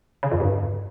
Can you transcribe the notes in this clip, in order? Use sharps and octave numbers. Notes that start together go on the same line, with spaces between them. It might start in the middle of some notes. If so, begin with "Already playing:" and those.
C#3
F2
G2